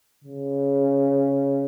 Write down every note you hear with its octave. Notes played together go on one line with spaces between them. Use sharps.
C#3